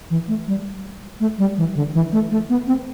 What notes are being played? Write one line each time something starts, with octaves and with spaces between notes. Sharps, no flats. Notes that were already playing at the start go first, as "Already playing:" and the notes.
E3
A3
G3
A3
G3
E3
D3
E3
A3
A3
B3
C4